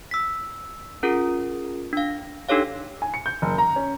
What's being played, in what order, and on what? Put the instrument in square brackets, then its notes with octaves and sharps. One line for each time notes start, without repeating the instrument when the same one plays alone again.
[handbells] E6 B6
C#4 F4 G#4 A#4
D4 F5
D4 D#4 G4 A4 C#5 F5
[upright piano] G#5
C#7
G6
F#1
A#5
C#4